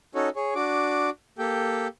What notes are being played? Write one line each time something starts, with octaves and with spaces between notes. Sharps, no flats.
C#4 D#4 F#4 A4 C#5
G#4 C#5
D4 F#4 D6
A#3 G4 A4 G5